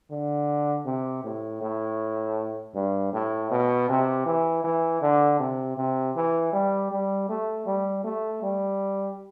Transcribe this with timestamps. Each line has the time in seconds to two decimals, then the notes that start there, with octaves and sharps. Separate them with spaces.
0.11 D3
0.86 C3
1.24 A2
1.62 A2
2.75 G2
3.13 A2
3.51 B2
3.89 C3
4.26 E3
4.64 E3
5.02 D3
5.40 C3
5.77 C3
6.16 E3
6.53 G3
6.91 G3
7.29 A3
7.66 G3
8.04 A3
8.43 G3